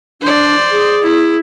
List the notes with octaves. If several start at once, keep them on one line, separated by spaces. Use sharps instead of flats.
D4 C5 D5
G#4
E4